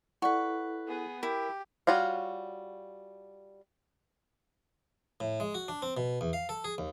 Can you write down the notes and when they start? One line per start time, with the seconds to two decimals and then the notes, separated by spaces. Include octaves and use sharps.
0.22 E4 A4 B4 D5 F#5 C#6
0.88 B3 G#4
1.23 E4 G4 A#4
1.87 G3 F4 F#4 C#5 F5
5.20 A2
5.40 G#3
5.54 F#4
5.68 D4
5.82 C4
5.97 B2
6.21 E2
6.33 F5
6.49 A4
6.64 G#4
6.78 D#2